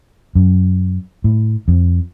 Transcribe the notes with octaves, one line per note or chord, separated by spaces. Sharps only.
F#2
A2
F2